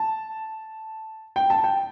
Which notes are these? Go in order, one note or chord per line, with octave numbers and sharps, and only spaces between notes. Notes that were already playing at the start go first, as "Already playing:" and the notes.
Already playing: A5
G5
A5
G5